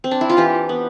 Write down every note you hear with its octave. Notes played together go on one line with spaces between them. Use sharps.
C4
D4
E4
F4
E3 G4
B3